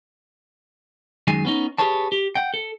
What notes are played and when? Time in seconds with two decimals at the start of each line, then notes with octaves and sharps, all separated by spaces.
1.27 F#2 D#3 G#3 G#5
1.45 B3 C#4 D#4
1.78 G4 G#4 B4 C#5 A5
2.12 G4
2.35 F#5 G5
2.54 A4